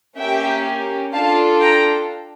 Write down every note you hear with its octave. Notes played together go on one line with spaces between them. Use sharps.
A#3 C#4 G4 E5 G5
D4 F4 A4 F5 A5
G5 A#5